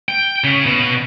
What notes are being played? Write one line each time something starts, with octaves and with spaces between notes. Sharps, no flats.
G5
C#3
B2